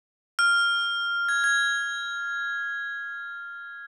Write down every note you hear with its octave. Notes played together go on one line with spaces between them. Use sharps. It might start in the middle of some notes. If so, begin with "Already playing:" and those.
F6
G#6
G#6